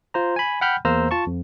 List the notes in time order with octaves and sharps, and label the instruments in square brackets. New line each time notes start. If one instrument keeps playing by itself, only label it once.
[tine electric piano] F4 C5 A#5
G#5 B5
F#5 G5 B5 F6 G6
E2 A#3 C5 F5 A#5 E6
F4 A5 C#6
F2